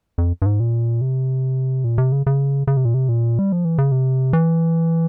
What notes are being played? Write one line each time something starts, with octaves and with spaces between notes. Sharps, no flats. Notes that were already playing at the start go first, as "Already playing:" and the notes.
F2
G2
G#2
A#2
C3
A#2
C3
C#3
C#3
C#3
C3
A#2
C3
A#2
G3
F3
E3
C#3
C3
E3